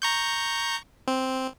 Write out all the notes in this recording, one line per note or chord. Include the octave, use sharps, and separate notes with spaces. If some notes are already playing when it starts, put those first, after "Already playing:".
A#5 C#6 G6
C4